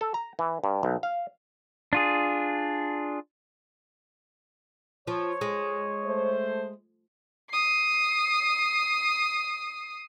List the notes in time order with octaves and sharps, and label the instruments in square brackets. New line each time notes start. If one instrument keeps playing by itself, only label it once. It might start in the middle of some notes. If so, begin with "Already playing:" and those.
[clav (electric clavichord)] A4
A#5
E3
G2
B1
F5
[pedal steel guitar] D4 F4 G#4
[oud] F3 [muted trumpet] C#5
[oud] G#3
[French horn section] A3 C5
[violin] D#6 C7